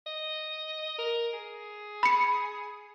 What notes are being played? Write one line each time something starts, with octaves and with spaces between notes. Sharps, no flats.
D#5
A#4
G#4
B5 C#7